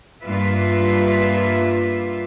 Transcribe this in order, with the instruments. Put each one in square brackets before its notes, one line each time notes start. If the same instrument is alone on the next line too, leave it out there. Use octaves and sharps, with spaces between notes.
[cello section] G2 A#3 F4 B4 E5